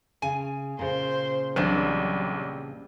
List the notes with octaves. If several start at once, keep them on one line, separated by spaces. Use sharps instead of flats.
C#3 G#5
A#2 C#3 C5
B1 E3 G3 C4 D4